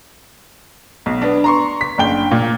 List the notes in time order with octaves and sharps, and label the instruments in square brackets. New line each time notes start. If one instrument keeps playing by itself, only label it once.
[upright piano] B1
B3 D4
A#5 C6 C#6
B6
F#1 D4 G5 G7
A#2